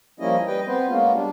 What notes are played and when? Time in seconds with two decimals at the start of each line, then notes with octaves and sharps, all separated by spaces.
0.20 F3 G3 A#3 C#4 E4 D#5
0.47 G3 B4 D#5 G5
0.67 B3 C4 B4 C5
0.89 G#3 A#3 B3 C#4 F4
1.13 G3 D4